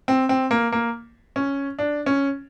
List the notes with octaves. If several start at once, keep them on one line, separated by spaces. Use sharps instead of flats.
C4
C4
A#3
A#3
C#4
D4
C#4